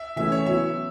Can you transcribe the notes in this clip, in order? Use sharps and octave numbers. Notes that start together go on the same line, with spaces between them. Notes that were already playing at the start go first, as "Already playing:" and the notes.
Already playing: E5
E3 A3 C#4 E5
C#5
F#3 B3 E4 E5